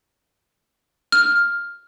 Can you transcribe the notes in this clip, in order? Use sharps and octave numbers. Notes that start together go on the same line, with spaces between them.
F6